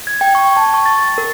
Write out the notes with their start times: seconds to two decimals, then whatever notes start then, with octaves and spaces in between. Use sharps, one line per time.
0.07 G#6
0.21 G5
0.35 C#6
0.57 A5
0.74 C#6
0.86 A6
0.98 A6
1.18 A#4